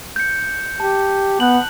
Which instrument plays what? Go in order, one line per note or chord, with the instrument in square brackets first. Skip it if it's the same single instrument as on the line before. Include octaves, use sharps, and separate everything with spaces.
[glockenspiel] G6 C#7
[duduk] G4 [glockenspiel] A5
[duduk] B3 [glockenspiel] F#6 F#7